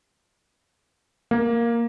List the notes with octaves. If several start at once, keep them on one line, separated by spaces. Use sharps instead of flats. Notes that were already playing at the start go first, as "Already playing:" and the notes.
A#3